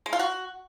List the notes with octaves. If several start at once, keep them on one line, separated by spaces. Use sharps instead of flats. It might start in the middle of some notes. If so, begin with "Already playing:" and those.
G#3
F4
F#4